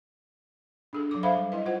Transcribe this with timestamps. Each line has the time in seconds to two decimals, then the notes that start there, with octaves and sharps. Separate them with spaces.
0.93 D4 G#4 A4
1.11 F#3 D6
1.23 A4 C5 E5 F5 B5
1.36 G3
1.52 E4 B4 D#5
1.65 F4 C5 F#5